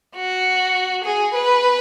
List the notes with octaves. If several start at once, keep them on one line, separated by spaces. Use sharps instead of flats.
F#4
G#4
B4